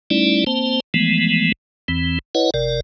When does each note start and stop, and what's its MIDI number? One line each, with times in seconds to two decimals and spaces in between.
0.10 0.44 55
0.10 0.44 57
0.10 0.44 61
0.10 0.44 63
0.10 0.44 64
0.10 0.44 74
0.47 0.80 58
0.47 0.80 60
0.47 0.80 72
0.47 0.80 81
0.94 1.52 52
0.94 1.52 53
0.94 1.52 56
0.94 1.52 57
0.94 1.52 59
1.88 2.19 40
1.88 2.19 52
1.88 2.19 60
2.35 2.50 64
2.35 2.50 71
2.35 2.50 73
2.35 2.50 75
2.35 2.50 78
2.54 2.80 31
2.54 2.80 48
2.54 2.80 70
2.54 2.80 74